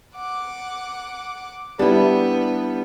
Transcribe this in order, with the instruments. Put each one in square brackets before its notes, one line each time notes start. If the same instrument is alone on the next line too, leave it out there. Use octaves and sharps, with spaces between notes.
[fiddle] F#5 D6
[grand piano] G3 [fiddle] B3 [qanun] D4 E4